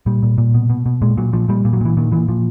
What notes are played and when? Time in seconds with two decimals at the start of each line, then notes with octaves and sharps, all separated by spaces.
0.06 A#2 G3
0.23 A#2
0.38 A#2
0.54 B2
0.70 B2
0.86 B2
1.02 A#2 G#3
1.17 A#2 F#3
1.33 A#2 F3
1.48 A#2 G3
1.65 A#2
1.73 F#3
1.81 A#2 E3
1.97 A#2 D#3
2.12 A#2 E3
2.28 A#2 F3